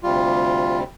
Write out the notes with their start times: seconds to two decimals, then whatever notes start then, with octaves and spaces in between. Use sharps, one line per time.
0.03 D2 C3 G3 F4